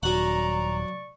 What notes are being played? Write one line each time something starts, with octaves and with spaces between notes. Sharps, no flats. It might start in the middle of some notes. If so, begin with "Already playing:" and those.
D#1 F#3 D5 F#5 A#5 C#6